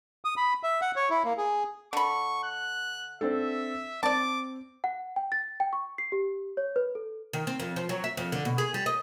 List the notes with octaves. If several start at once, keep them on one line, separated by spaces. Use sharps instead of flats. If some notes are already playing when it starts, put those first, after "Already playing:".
D#6
B5
E5
F#5
C#5
E4
A#3
G#4
D3 B5 C#6
F#6
C4 D4 A4 E5
C4 D5 A5 D6
F#5
G5
A6
G5
C#6
C7
G4
C#5
B4
A4
D#3
C4
F2
F3
F#3
E5
F2
D3
B2
G#4
G3
D#5